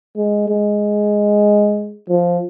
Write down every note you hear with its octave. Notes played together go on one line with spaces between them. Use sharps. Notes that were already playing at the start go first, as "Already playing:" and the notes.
G#3
G#3
F3